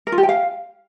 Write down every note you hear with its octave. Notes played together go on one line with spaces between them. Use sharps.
A#4
F4
G4
G5
F5